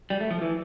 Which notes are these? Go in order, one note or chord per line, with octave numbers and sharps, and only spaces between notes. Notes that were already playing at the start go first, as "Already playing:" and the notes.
G3
A3
F3
E3